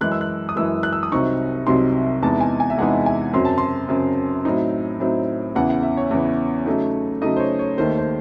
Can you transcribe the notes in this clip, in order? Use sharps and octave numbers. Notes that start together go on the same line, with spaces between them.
F#2 E3 G#3 F#6
E6
F#6
D#6
F#2 E3 G#3 E6
F#6
E6
D#6
C2 C3 F#3 C4 D#4 C#6
C2 C3 F#3 C4 D#4 C6
E2 C3 E3 G#3 D#4 A5
G#5
G#5
E5
E2 C3 E3 G#3 D#4 F#5
G#5
F#2 C#3 F#3 C4 C6
A5
C6
F#2 C#3 F#3 C4
A2 F#3 C4 D#4
A2 F#3 C4 D#4
E2 C#3 E3 F#5
F#5
E5
C#5
E2 C#3 E3
C#3 F#3 A3 D#4
C#3 F#3 A3 D#4 D#5
C5
C#5
C#5
D#2 D#3 A3 C5
C5